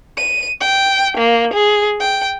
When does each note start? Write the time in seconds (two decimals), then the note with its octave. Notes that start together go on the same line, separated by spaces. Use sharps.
0.17 D#7
0.61 G5
1.17 A#3
1.53 G#4
2.00 G5